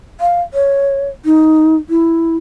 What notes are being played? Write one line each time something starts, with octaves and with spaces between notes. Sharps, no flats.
F5
C#5
D#4
E4